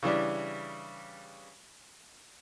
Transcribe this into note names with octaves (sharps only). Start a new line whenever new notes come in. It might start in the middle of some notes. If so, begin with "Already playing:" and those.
C#3 E3 G3 D4